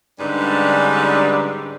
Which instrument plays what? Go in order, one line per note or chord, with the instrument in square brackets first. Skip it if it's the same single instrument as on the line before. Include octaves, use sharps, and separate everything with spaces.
[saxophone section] G#2 D3 G3 C#4 D4 B4